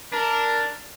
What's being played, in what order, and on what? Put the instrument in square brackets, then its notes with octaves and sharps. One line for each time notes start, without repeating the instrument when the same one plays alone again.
[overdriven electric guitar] D4 [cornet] A#4